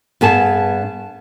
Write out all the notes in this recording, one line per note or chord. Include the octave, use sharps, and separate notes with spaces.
G2 B3 G#4 A5